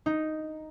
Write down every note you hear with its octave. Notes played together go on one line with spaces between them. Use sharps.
D#4